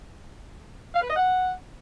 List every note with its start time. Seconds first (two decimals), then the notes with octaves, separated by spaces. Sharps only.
0.94 F5
1.01 B4
1.09 D#5
1.16 F#5